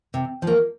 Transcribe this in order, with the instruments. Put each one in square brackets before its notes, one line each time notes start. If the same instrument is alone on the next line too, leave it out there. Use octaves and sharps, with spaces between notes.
[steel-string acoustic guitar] C3
F3 A#3